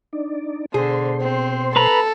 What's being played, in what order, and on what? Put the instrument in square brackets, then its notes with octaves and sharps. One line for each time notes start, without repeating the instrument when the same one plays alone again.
[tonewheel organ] D4 D#4 D5
[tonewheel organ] B2 C5 C6 [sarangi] D3 [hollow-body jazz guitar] G#4
[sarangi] C4
[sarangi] A4 [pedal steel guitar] B4 A#5 B5